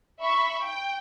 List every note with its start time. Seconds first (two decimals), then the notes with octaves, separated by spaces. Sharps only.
0.22 E5 B5 C#6
0.64 G5